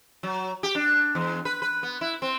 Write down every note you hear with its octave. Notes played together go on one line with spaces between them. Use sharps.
F#3
G4
D4
E2
B4
B4
B3
E4
C4